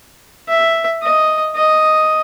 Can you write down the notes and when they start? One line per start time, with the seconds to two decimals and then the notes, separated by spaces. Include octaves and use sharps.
0.48 E5
1.02 D#5
1.55 D#5